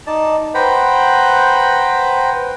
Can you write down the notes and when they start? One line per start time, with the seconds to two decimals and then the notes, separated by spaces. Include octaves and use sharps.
0.07 D#4 D5 A5
0.54 B4 C5 F#5 G5 A#5 B5